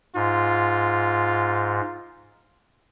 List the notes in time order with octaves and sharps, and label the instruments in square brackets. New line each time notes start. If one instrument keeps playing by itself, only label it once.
[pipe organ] G#2 [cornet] F4